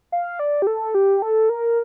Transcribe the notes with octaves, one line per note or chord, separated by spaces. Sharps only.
F5
D5
G4
A4
G4
A4
A#4